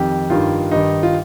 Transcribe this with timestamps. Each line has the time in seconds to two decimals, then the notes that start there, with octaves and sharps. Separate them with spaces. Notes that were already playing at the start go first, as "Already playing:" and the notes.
Already playing: F2 D#3 G4
0.30 G2 D#3 F4
0.71 G2 D#3 D#4
1.03 F4